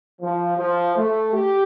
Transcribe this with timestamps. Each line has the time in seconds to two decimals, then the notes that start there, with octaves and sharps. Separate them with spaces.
0.21 F3
0.58 F3
0.96 A3
1.34 G4